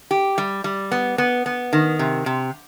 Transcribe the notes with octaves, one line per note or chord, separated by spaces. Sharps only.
G4
G3
G3
B3
B3
B3
D#3
C3
C3